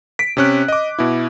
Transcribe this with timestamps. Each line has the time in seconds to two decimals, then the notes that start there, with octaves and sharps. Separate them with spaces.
0.19 B6 D7
0.37 C3 C#4 F#6
0.68 D#5 D6
0.99 B2 E4